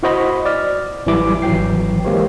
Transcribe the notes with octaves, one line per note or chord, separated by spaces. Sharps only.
E4 F#4 C5 D#5 B5
D5 F6
A1 E3 F#3 G3 E4 D6
G#1 E3 F#3 G5 C7
E3 G#3 A#3 G4 C5 C#5